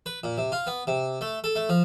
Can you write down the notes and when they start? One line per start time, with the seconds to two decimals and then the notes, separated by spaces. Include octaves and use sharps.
0.06 B4
0.24 A#2
0.38 C3
0.52 F4
0.67 B3
0.87 C3
1.21 A3
1.44 A4
1.56 A3
1.69 F3